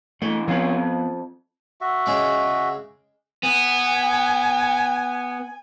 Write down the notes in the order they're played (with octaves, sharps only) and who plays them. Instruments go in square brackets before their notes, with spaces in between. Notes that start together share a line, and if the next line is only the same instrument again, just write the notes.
[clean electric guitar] B2 E3 [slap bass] A3
[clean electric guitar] C3 C#4 F4 [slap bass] F3 B3
[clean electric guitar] F2
[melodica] F#4 E5
[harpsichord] C#3 G#3 D6
[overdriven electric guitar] B3 [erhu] G#5